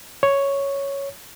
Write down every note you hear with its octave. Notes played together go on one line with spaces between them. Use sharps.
C#5